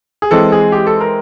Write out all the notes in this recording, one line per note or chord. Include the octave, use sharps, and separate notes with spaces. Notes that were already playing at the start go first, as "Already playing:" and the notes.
G#4
E3 G#3 C4 A4
G#4
G4
A4
A#4